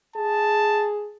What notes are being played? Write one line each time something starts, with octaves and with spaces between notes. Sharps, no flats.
G#4 A5